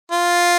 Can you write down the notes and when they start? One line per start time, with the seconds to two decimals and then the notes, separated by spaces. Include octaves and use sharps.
0.12 F4